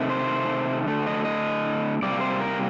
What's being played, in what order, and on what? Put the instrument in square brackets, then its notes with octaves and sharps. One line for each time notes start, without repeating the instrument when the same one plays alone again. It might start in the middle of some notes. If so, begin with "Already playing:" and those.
Already playing: [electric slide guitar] C3 D#3 A3
C5
D3 A3
D#5
D#5
C3 G3 A#3 D5
C5
A#4